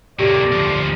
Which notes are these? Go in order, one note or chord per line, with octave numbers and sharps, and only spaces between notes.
C3 A#3 G4 A4 C#5 D5
D2 F3